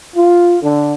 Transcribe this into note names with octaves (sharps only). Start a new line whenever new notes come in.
F4
D3